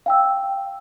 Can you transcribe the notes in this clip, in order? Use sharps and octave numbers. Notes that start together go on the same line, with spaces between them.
F5 G5 E6